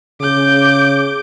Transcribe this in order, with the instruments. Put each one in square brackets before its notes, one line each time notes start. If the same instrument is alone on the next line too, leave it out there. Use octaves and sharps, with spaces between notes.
[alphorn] C#3 [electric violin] D6 G6